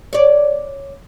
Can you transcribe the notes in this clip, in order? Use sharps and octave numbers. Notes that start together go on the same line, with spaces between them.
C#5 D5